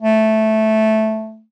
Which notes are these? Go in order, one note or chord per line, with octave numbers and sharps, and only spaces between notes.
A3